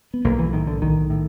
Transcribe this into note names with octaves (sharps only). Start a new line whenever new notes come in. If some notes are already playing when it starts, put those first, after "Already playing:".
B3
B1 A#3
E3
A2 D#3
D3
B1 D#3
A2